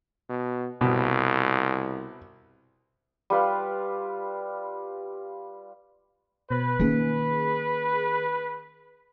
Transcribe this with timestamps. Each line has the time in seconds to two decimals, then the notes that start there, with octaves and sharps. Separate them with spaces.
0.29 B2
0.81 C2 B2
3.30 G3 F4 B4 F5
6.51 B2 B4 C5 F#6
6.79 D#3 A#3 C#4 G#4